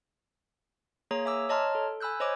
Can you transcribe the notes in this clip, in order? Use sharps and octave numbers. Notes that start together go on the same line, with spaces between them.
A#3 G#4 C#5 A#5
E5 G#5 D6 E6
C#5 D#5 A5 A#5 C6 F6
A4
G#5 B5 E6 F#6 G6
C5 C#5 D#5 G#5 D6